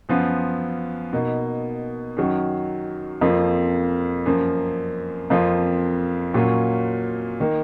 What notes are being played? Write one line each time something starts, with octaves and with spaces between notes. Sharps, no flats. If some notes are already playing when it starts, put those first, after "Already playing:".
F#2 F3 B3 F4
B2 A#3 D#4
F#2 D#3 F#3
F2 F3 A#3 F4
F#2 F3 A#3
F2 F3 A#3 F4
A#2 F#3 A#3 C#4 F4
D#3 A#3